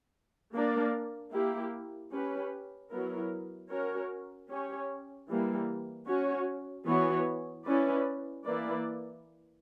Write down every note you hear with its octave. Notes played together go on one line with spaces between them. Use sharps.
A#3 D4 A#4 D5
A#3 E4 G4
C#4 G4 B4
F#3 B3 E4 A#4
C#4 F#4 A#4 C#5
C#4 G4 C#5
E3 G3 A#3
C#4 F#4 C#5
E3 B3 F#4 C#5
C#4 E4 B4 D5
E3 A#3 E4 B4 D5